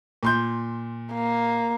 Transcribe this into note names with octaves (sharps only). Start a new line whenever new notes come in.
A#2 C6 G6
A#3